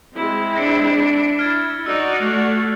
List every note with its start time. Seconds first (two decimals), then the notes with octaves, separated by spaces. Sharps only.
0.16 G#3 C4 E4
0.56 D4 A#6 C#7
1.39 E4 F6 G#6 A6
1.86 D#4 F#4 D5 E6
2.20 A3 F#6 C7 F7